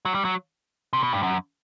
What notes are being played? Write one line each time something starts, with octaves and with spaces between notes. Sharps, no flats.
F#3
G3
F#3
C3
B2
G2
F#2